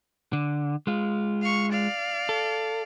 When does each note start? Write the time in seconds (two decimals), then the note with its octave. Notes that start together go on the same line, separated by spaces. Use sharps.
0.33 D3
0.87 G#3 F4
1.42 F5 C#6
1.72 D5 F5
2.29 A4